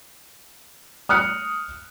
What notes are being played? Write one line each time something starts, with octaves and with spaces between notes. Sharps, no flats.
D#6 F6 F#6 C#7